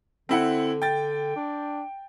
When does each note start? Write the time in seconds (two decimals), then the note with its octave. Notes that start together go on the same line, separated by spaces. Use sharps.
0.29 D3 C4 E4 F#5
0.82 G5 A6
1.36 D4